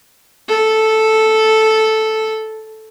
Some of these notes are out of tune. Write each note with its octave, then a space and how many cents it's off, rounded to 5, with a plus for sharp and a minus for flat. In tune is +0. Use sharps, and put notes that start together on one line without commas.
A4 -5